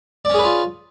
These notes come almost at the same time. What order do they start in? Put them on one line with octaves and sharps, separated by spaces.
D5 C#4 G#4 B4 F4